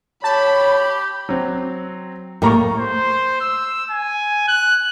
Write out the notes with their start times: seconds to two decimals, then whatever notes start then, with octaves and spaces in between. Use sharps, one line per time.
0.24 G4 C#5 A5 B5
1.29 F#3 C4
2.42 A2 A#3 G4 A#5 C#6
2.78 C5
3.41 E6
3.91 G#5
4.48 F#6